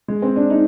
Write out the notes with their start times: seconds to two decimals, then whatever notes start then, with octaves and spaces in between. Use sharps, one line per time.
0.08 G#3
0.22 C4
0.36 D4
0.50 D#4